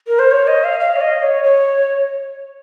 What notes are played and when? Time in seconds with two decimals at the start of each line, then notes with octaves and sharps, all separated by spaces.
0.07 A#4
0.19 C5
0.32 C#5
0.47 D#5
0.64 F5
0.80 F5
0.96 C#5
1.01 D#5
1.23 C#5
1.43 C#5